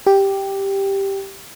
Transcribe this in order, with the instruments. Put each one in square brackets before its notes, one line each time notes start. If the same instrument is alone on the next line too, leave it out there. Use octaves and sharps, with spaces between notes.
[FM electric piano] G4